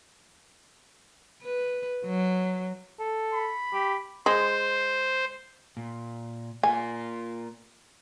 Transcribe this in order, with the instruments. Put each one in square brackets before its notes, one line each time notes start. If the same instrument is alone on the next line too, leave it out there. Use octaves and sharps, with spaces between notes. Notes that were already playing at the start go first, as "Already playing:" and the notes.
[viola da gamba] B4
F#3
[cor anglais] A4
[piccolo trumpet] B5
[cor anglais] G4
[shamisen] G#3 [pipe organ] C5
[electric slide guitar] A#2
[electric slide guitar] A#3 F4 [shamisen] G#5